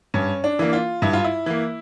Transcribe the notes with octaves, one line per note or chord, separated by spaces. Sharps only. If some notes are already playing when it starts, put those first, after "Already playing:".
G2 C#4
D4
E3 A#3
F4
G2 E4
F4
E4
E3 A#3